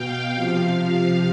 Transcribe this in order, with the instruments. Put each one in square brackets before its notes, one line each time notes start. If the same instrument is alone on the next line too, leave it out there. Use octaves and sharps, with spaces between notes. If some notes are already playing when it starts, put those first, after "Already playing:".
Already playing: [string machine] B2 F5 G5
C3 F3 F5